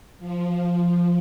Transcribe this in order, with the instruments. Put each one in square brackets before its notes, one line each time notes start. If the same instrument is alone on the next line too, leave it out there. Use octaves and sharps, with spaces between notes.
[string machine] F3